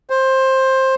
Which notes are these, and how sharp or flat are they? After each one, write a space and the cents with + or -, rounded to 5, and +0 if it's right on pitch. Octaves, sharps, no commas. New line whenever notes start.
C5 +15